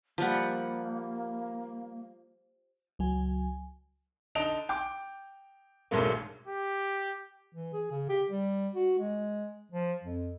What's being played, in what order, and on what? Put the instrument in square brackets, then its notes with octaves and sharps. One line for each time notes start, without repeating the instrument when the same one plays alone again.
[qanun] F3 G3 F#5 [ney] A#3
[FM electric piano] C#2 F#3 G#5
[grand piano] D3 D#4 A5 D7 F7
G5 D6
E1 B1 G#2 A3 A#3
[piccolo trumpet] G4
[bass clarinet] E3
G#4
C#3
G4
G3
F#4
G#3
F3
F2